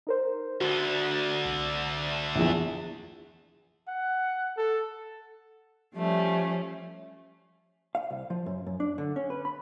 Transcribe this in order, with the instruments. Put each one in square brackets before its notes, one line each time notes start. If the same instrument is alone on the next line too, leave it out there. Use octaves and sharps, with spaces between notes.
[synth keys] D#4 A#4 C5
[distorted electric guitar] D2 D3 [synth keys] F#4
[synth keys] C2
[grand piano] A#1 E2
[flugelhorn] F#5
A4
[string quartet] F3 G3 A3 C#4
[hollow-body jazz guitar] F5
C2
F3
F#2
F#2
D4
D3
C#4
B4
B5